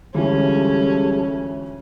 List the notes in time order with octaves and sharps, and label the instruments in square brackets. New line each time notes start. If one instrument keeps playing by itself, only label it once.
[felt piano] D2 E3 F4 [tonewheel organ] G3 G#3 A4 [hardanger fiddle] C#4